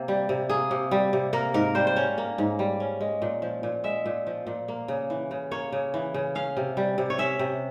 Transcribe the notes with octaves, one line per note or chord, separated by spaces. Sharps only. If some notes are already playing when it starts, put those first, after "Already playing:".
Already playing: C3 A#3
G3
C3
A#3 G#4
C3
G3
C3
A#3 A#4
G#2 A#4
G3 C5
C5
C#4 C#5
A#3
G#2
G3
C#4
G#3
A#2
F3
A#2
G#3 E5
A#2
F3
A#2
A#3
C#3
E3
C#3
A#3 C#5
C#3
E3
C#3
C#4 F5
C3
G3
C3
C#5
C#4 E5
C3